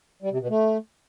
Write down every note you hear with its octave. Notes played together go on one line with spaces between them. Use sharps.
G3
C3
B2
A3